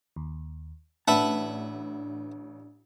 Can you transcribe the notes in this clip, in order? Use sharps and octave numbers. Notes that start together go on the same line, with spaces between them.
D#2
A1 D4 B4 E5 F#5 A5